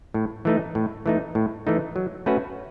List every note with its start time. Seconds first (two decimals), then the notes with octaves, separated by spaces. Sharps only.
0.14 A2
0.45 E3 A3 D#4
0.75 A2
1.06 E3 A3 D#4
1.35 A2
1.67 E3 A3 D#4
1.96 F#3
2.26 A3 C#4 F#4 B4